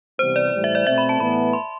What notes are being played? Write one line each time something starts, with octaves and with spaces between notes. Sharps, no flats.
C3 E3 G3 B3 C5
D5
A2 E3 G3
E5
D5
B2 A3 C4 E5
B5
A5
A2 E3 B3 B5
C6